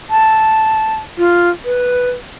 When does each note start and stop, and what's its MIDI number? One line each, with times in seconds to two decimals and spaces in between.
0.10 0.95 81
1.18 1.49 65
1.65 2.11 71